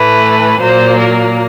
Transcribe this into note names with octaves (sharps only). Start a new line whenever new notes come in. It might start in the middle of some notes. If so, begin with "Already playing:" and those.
Already playing: A2 E3 A3 B4
A#2 F#3 A#3 C5
A#4